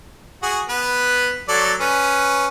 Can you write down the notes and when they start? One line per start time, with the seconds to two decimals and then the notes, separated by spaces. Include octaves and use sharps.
0.43 F#4 G#4
0.69 B3 B4
1.49 F#3 A4 D5
1.80 C#4 B4